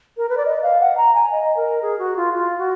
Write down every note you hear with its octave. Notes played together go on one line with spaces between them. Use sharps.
A#4
B4
D5
D#5
F5
F#5
A#5
G#5
D#5
A#4
G#4
F#4
F4
F4
F#4